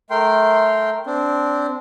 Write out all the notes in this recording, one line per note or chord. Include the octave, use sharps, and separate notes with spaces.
A3 A#4 G5 C6
C4 D4